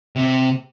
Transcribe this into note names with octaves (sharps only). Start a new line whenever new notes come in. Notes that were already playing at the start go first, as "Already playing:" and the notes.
C3